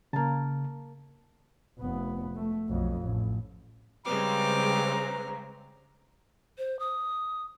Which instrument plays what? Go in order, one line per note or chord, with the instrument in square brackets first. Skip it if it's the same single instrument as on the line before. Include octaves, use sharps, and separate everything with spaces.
[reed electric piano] C#3 [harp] A#3 A5
[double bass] F1 B3
A3
B1 F2
A1
[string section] C#3 G#3 C4 [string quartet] G3 D6 F6 [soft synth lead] B4 [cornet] A#5
[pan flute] C5
D#6